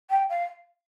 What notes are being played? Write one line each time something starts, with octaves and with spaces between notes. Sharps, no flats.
G5
F5